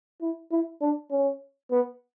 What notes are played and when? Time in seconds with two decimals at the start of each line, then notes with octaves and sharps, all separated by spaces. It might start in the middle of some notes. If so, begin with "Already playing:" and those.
0.21 E4
0.52 E4
0.81 D4
1.11 C#4
1.71 B3